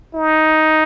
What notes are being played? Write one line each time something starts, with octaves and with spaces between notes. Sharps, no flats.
D#4